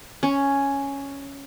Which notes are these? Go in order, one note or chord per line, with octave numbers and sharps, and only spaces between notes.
C#4